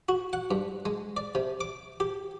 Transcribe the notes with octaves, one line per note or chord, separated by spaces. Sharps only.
F#4
F#5
G2
G#3
D5
C3
D6
G4